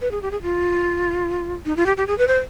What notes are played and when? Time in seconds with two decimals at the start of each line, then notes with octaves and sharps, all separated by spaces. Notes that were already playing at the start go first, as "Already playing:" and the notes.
0.02 B4
0.11 G#4
0.22 G4
0.31 G#4
0.42 F4
1.66 D#4
1.77 F4
1.86 G4
1.97 G4
2.07 G#4
2.18 B4
2.28 C5